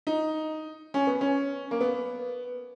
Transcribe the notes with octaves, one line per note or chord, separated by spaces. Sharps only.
D#4
C#4
B3
C#4
A#3
B3